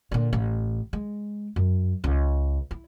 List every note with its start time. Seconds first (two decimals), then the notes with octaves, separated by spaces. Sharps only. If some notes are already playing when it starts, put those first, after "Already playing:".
0.12 A#2 D3
0.33 A1
0.93 G#3
1.56 F#2
2.04 C#2
2.71 E4